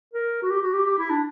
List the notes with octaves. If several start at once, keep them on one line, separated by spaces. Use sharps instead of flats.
A#4
F#4
G4
F#4
G4
G4
E4
D4